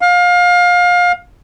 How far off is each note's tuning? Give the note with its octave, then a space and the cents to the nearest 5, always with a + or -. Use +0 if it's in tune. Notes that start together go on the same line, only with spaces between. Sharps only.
F5 +25